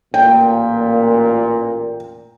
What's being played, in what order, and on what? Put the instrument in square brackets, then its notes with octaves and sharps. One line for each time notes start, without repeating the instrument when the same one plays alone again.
[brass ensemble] A1 A#2 [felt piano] G5